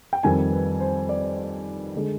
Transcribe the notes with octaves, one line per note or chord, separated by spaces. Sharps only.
G5
F2 D#3 G3 G#5
B4
C5
D5
D3 G#3